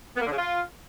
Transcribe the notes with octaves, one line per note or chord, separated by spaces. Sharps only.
B3
A#3
D3
C#3
F4